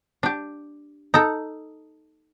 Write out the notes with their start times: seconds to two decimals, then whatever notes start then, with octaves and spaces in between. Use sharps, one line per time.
0.23 D4 G4
1.14 D#4 A4